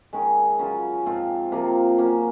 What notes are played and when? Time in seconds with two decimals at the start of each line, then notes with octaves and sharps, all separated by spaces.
0.13 D#3 G#3 C#4
0.59 C#3 F#3 C#4 F4
1.06 G#2 F3 C4 F4
1.52 C3 F3 A#3 F4
1.98 F#3 A#3 C#4